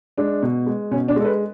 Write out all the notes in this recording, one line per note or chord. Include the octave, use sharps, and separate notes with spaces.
G#3 D4
B2
G#3
B2 C#4
D4
G#3 A4
B4